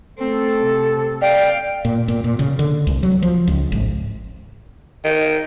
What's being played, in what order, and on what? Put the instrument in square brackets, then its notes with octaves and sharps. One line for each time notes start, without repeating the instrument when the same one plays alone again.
[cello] A3 C4 [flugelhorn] A4
[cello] C3
[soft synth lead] D5 [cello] F5 [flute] G5
[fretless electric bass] A#2
A#2
A#2
C#3
D3
C2
F#3
F3
C#2
G#1
[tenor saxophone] D#3